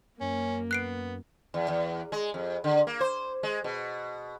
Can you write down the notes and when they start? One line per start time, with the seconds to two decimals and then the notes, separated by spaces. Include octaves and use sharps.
0.21 F#2 A#3 C#4
0.71 B3 F#6 C7 D7
1.54 E2
1.68 E2
2.12 G#3
2.34 F2
2.64 D3
2.87 A#3
3.00 C5
3.43 G#3
3.64 B2